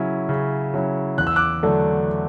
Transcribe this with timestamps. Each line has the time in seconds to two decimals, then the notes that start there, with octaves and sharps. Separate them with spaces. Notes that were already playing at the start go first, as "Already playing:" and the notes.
Already playing: C#3 F#3 C#4 E4
0.29 C#3
0.74 F#3 C#4 E4
1.18 E2 F#6
1.27 E6
1.36 D6 F#6
1.63 D3 F#3 A3 D4